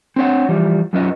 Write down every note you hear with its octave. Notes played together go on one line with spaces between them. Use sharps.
C4 D4 C#5 F#5
E3 F3 G3
F#2 F#3 C#4 F4 B4 D#5